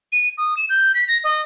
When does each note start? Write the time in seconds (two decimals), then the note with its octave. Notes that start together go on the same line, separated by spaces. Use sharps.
0.12 D#7
0.38 D#6
0.57 E7
0.69 G6
0.95 B6
1.08 A#6
1.24 D#5